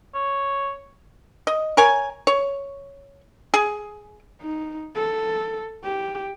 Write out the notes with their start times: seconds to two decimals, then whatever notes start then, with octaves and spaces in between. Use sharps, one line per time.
0.14 C#5
1.47 D#5
1.77 A#4 C#5 G#5
2.27 C#5
3.54 G#4
4.42 D#4
4.95 A4
5.84 G4